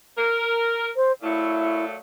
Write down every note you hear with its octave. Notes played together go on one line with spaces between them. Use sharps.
A#4
C5
A#2 F#3 A3 E4